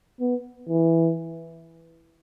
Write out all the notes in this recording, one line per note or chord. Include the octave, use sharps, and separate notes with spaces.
B3
E3